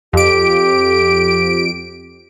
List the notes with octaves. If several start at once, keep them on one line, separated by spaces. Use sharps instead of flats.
F2 G4 D7